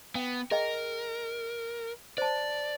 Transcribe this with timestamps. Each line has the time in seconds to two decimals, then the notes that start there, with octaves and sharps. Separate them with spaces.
0.15 B3 G5
0.51 G#4 A#4 D#5 G5
2.18 C5 D5 A5